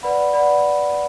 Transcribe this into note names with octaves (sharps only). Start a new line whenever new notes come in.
B4 D5 F#5 B5
B4 D5 F#5 B5